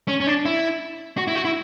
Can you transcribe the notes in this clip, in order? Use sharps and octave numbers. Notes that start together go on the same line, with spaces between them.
C#4
C#4
D4
E4
F#4
E4
F#4
E4